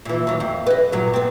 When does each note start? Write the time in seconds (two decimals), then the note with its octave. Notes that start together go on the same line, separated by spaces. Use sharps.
0.05 A#2 E3
0.27 D#2 F#3
0.40 F2
0.67 B4 D#5
0.92 G2 A#2 F#3
1.14 B3 C4